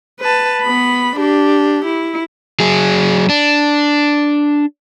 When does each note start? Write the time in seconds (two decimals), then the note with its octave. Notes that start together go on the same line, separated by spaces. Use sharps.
0.21 B4 A5
0.62 B3 B5
1.16 D4 G4
1.85 E4
2.60 F#3 G#4
3.29 D4